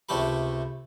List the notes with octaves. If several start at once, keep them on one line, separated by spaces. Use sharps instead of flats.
C#2 C3 A3 G4 A4 B5